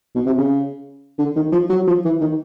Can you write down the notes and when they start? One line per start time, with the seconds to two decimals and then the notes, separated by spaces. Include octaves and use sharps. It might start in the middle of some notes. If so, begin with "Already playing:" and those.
0.15 B2
0.26 C3
0.38 C#3
1.19 D3
1.36 D#3
1.52 F3
1.69 F#3
1.87 F3
2.04 E3
2.21 D#3